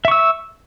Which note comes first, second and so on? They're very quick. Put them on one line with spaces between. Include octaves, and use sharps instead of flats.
E5 C#6 E6